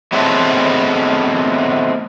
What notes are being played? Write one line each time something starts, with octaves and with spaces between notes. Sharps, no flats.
F#3 G#3 A3 B3 C4 D4